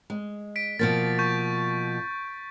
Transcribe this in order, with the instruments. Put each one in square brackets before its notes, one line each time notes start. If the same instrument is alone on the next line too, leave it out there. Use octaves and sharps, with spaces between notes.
[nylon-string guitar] G#3
[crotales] B6 D7
[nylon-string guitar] B2 F3 A#3 [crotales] A6
[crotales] C#6 G6